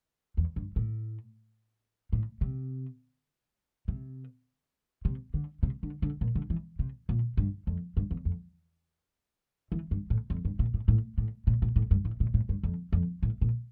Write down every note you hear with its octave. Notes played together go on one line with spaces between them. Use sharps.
E2
G2
A2
A2
C3
C3
C3
D3
C3
D3
D3
A#2
D3
E3
C3
A#2
G2
F2
G2
E2
F2
E3
G2
A2
F2
G2
A#2
A2
A2
A2
A#2
A#2
A2
G2
A2
A#2
A2
G2
F2
F2
A2
A#2